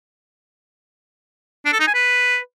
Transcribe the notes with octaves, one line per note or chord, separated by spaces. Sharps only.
D4
A4
D#4
G#5
B4